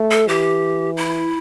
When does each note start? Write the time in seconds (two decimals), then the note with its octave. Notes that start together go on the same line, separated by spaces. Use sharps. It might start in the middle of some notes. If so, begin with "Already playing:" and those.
Already playing: A3
0.11 A4
0.28 E3 G4
0.97 E4